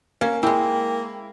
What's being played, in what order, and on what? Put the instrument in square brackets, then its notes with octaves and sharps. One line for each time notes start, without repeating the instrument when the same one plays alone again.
[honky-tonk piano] A#3 [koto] C#4
[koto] G#3 C4 [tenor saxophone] A#3 [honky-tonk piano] E4 [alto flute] G5